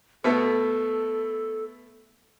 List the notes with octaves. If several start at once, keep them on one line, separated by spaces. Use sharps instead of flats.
B2 A3 B3 A4